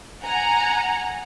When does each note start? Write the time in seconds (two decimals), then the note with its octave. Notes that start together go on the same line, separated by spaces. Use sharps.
0.23 F#5 G#5 A#5